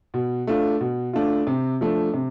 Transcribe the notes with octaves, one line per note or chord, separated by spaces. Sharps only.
B2
A3 D4 F4
B2
A3 D4 F4
C3
F3 A3 D4
C3